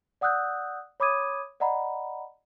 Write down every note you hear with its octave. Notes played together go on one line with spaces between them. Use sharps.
D5 F#5 D#6 E6 F#6 G6
C#5 B5 D6 D#6 G#6 D#7
D5 D#5 F#5 A#5 B5